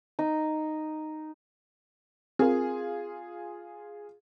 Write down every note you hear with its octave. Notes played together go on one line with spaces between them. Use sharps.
D#4
C4 F4 G#4 A#4